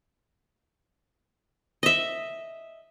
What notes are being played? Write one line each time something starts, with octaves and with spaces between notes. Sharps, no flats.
D#5 E5